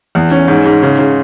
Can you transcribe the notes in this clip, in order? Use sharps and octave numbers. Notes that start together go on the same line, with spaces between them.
E2
C#4
G#2
G#2
C#3
C#3